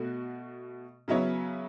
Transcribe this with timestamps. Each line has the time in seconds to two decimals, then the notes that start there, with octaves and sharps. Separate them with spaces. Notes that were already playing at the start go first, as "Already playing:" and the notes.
Already playing: B2 A3 F#4
1.08 C#3 F#3 B3 E4 C#5